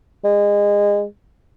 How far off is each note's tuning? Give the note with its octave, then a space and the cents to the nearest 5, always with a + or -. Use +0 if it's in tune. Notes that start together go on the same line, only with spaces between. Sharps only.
G#3 -25